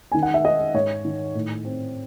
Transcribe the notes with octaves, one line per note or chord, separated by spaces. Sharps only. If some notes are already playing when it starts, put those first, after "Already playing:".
D#3 G#5
F#5
E5
D#4 D#5
G#2 C#5
D#3
A2
C4